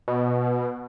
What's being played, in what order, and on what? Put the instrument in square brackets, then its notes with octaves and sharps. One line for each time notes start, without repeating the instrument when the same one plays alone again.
[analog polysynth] B2